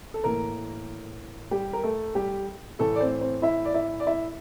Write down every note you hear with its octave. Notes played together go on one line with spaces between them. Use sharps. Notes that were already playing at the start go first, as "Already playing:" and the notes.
A4
A2 E3 A#3 A#4
G3 G4
A#4
A3 A4
G3 G4
A2 E3 A3 A4
D5
C4 C5
C4 C5
E4 E5
D5
E4 E5
D5
E4 E5